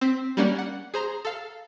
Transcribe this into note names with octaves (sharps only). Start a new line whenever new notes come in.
C4 B6
G3 A#3 C#4 D5 F#5
F#5
G#4 C5 A#5 C6
A4 F5